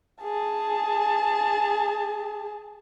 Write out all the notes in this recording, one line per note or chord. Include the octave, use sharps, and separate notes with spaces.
G#4 A5